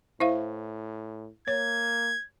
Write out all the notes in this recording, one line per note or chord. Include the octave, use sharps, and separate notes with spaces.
A2 E4 C5 E5 F5
A#3 C#5 G#6